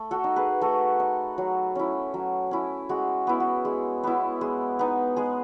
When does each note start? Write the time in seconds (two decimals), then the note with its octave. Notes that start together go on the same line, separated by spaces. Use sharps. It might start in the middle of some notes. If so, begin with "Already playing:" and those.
Already playing: A3
0.11 F#4 A4
0.24 D#4
0.36 G#4 B4
0.61 A3 F#4 A4
1.00 D#4
1.38 F#3
1.75 C#4 E4
2.14 F#3
2.51 C#4 E4
2.89 G#3 F#4
3.27 B3 E4
3.40 F#4
3.65 G#3
4.03 B3 E4
4.41 G#3
4.79 B3 D#4
5.16 G#3 G#4